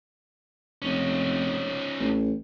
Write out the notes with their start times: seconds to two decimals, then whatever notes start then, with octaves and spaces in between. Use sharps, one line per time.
0.82 F1 C#4 D#4
2.00 A1